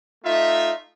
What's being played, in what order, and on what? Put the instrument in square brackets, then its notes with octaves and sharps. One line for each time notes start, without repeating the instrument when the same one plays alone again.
[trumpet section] A3 D#4 F4 E5